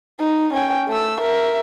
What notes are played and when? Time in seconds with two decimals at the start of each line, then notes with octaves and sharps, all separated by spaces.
0.20 D#4
0.53 C#4 G5
0.88 A3 E6
1.20 A#4 E5